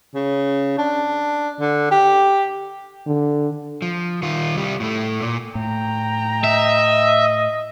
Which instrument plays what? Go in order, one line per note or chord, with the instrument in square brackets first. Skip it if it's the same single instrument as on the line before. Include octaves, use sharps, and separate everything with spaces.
[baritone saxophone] C#3
D4
D3
G4
[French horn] D3
[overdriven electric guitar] F3
D#3 F4
C2 G3
A2 A3
A#2
[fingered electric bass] A2 [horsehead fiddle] G5 A#5
[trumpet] D#5 [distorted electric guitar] E5